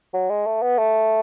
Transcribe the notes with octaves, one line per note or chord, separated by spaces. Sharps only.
F#3
G#3
A3
B3
A3